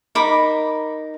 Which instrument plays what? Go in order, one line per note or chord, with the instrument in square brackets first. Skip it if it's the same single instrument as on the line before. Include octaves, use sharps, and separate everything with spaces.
[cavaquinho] D#4 A#4 B5 D6